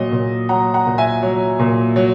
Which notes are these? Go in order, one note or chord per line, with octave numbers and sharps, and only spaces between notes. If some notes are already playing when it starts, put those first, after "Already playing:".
Already playing: A#2 F#3 D#5
A#2
F#3 F#5 A#5
F#5 A#5
A#2
E5 G#5
F#3
A#2
F#3